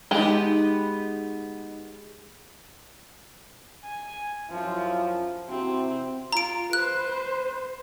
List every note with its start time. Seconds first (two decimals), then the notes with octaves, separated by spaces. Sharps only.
0.11 G#3 B3 D#4 G4
3.85 G#5
4.51 F#2 F3 E4 F4
5.48 C3 C4 E4 F#4
6.33 F4 A#5 D7
6.73 B4 C5 F#6